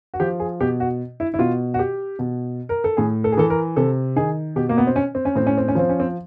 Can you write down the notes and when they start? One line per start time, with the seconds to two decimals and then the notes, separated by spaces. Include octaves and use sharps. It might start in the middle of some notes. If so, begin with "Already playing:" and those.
0.14 F#4
0.20 F3 G4
0.40 G#4
0.60 B2 G4
0.80 F#4
1.20 E4
1.34 E4
1.39 B2 F4
1.74 F#4
1.79 G4
2.19 B2
2.69 A#4
2.84 A4
2.97 A2 G#4
3.24 A4
3.32 G#4
3.37 E3 A4
3.50 A#4
3.76 C3 A4
4.16 D#3 G#4
4.56 B2 G4
4.69 A#3
4.78 B3
4.87 C4
4.96 C#4
5.15 C4
5.25 C#4
5.35 A2 C4
5.47 C#4
5.57 C4
5.68 C#4
5.75 F3 C4
5.89 C#4
6.00 C4